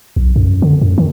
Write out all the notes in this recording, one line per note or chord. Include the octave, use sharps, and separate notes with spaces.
B1
F#2
D3
F#2
D#3